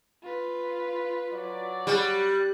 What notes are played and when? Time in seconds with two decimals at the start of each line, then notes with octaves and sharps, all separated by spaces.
0.23 F4 B4
1.33 F#3 D5
1.87 G3 F#6